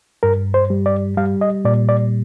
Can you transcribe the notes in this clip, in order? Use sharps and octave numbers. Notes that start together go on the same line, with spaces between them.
G2 A#4
C5
G3
D5
G3 F5
D#5
A#2 D5
D5